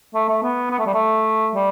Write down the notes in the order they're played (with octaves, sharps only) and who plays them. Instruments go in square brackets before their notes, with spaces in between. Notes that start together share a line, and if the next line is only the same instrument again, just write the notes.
[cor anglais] A3
A3
B3
B3
A3
G3
A3
G3